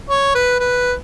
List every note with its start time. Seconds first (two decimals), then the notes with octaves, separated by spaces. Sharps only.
0.10 C#5
0.35 B4
0.60 B4